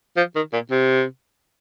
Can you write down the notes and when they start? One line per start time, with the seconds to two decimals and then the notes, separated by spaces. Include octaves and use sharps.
0.17 F3
0.35 D#3
0.53 A#2
0.71 C3